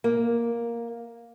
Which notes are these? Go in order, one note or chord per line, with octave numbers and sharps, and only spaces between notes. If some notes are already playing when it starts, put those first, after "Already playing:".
A#3